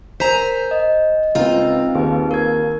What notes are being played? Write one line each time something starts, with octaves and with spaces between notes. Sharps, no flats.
A#4 C5 G#5 A#5 B6
D#5
C#2 B3 C4 D#4 F4
D#2 G#4 B4
A#4 G#6